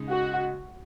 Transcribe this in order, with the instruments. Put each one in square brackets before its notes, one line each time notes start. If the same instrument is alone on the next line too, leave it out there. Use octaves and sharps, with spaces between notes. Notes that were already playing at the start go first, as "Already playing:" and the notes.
Already playing: [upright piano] C#3 G#3 D#4
[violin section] F#4